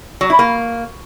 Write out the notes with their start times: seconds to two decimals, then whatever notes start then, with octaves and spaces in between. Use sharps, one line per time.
0.21 F#3
0.30 E4
0.39 A#3